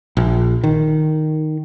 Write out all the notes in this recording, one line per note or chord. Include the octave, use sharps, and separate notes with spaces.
A#1
D#3